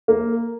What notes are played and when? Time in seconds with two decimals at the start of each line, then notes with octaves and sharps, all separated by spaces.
0.08 A#3